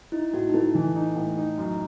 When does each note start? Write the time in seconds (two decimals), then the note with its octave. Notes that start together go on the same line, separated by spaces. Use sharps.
0.12 D#4 E4
0.33 A2 F#4
0.49 D#4
0.54 A3 E4
0.75 E3
0.95 D#4
1.16 A2
1.37 D#4
1.58 F#2